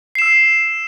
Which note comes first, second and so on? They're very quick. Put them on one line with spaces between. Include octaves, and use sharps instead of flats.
C7 E7 E6